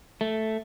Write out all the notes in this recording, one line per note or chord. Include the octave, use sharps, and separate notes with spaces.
A3